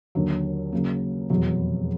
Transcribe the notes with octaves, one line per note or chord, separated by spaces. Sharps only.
D#2 D3 F#3
C#3 F#3 A#3
F1 E2 B2 F#3